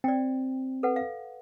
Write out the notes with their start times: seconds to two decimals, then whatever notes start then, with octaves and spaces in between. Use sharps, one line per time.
0.04 C4 D5 G5
0.83 A4 B4 F#5
0.96 F5